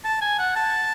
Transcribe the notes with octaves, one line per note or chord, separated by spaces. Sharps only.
A5
G#5
F#5
A5